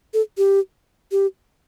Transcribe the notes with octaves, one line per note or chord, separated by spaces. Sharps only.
A4
G4
G4